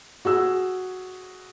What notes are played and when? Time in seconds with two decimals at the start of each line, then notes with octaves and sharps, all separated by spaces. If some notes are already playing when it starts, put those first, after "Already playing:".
0.25 F#4 G#4 E6